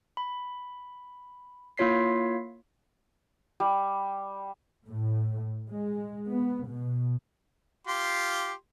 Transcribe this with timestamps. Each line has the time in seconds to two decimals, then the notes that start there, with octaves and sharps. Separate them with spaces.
0.17 B5
1.78 A#3 E4 F4 C#5 B6 C7
3.60 G3
4.88 A2
5.70 G#3
6.30 B3
6.69 B2
7.87 F4 G4 C6